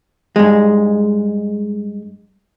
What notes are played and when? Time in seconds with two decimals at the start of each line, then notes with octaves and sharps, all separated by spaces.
0.36 G2 G#3